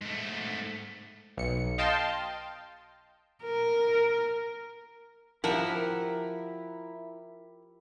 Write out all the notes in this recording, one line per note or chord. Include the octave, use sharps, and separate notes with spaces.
G#2 A3
B1 C#7
D#5 F5 G5 A5 C6
A#4
F3 E4 G4 A#4 E5 F#5 A5